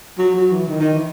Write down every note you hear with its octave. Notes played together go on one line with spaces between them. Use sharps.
F#3
F#3
E3
D#3
D#3
E3